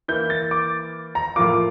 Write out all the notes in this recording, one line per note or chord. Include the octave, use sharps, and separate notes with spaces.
E3 A#3 E4 G6
A6
D6
A#5
A2 F3 A#3 F4 D6